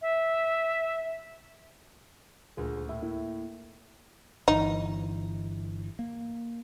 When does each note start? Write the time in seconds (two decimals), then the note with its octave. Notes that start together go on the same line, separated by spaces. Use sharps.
0.02 E5
2.57 D#1 D2 A#2 G#4
2.89 A2 E5
3.02 A#3 E4
4.48 G1 E3 D#4
5.99 A#3